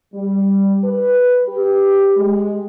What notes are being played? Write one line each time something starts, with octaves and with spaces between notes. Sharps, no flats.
G3
B4
G4
G#3